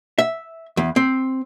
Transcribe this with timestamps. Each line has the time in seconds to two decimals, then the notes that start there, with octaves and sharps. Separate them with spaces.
0.18 E5
0.77 E2
0.96 C4